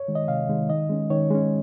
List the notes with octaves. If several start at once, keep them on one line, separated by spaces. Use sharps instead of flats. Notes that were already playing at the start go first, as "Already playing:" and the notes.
Already playing: C#5
D#3 G#3
D#5
C3 F5
D#3 G#3
D#3 D#5
G#3 C#4
D#3 C#5
G#3 C#4